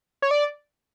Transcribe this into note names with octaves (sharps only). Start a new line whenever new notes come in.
C#5
D5